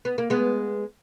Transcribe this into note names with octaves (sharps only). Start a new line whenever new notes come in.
B3
A#3
G#3 B3